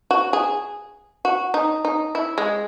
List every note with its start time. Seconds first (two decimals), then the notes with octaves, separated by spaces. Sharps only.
0.11 F#4
0.33 G#4
1.25 F#4
1.54 D#4
1.85 D#4
2.15 E4
2.38 G#3